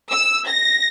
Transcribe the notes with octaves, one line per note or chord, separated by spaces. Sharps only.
E6
A#6